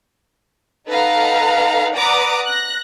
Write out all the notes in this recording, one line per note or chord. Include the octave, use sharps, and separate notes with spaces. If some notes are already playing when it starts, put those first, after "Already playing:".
D#4 A4 B4 F5 F#5 A#5
B4 D5 F#5 A#5 D6 D#6
F#6 A#6